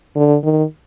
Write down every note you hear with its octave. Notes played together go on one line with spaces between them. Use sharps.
D3
D#3